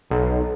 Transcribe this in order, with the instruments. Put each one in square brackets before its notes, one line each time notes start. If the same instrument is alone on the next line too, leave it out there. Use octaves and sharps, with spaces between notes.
[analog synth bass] B1